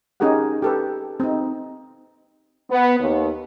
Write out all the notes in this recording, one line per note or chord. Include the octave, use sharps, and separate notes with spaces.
C#4 D#4 G4 G#4 A#4 F#5
G4 A4 B4
C4 D#4
B3
D#2